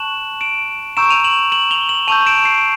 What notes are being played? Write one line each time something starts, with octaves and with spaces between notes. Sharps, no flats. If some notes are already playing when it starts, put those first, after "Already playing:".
Already playing: A5 C#6 F#6 E7 F#7
D7 E7
A#5 C#6 E6 G6 D7 E7
D#7 F7
E7 F#7
E7 F#7
F7 G7
E7 F#7
A5 C#6 E6 G6 D#7 F7
D7 E7
C7 D7